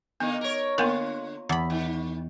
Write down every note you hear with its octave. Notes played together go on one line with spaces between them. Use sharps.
D3 A#3 B3 D#4
A#4 C#5
D3 A#3 B3 F4 A#4
E2 B5
D#3